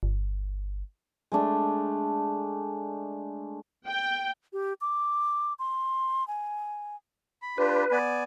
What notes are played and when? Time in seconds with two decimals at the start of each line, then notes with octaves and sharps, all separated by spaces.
0.03 G1
1.32 G#3 A3 D4
3.87 G5
4.53 G4
4.81 D6
5.59 C6
6.28 G#5
7.42 B5
7.58 D4 F4 G4 B4
7.92 B3 D5 G#5